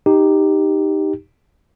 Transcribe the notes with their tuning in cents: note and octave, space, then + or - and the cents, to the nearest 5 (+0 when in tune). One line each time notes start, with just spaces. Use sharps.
D#4 -5 G4 +0